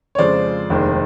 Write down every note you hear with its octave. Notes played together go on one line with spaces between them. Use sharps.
C#5
F2 C#3 F3 G#3 C5 D5
F1 D#2 D#3 G#3